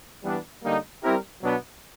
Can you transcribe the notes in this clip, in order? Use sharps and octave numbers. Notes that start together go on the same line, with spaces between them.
E3 G3 B3 D4
D3 G3 A#3 D#4
G3 C4 E4 G4 A#4
B2 F#3 B3 D4